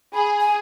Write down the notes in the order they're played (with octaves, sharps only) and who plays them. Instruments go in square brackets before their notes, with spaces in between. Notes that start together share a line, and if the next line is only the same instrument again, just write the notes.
[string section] G#4 [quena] B5
[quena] G#5